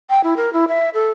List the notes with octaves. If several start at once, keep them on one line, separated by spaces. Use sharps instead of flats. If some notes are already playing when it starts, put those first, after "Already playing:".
G5
E4
A#4
E4
E5
A4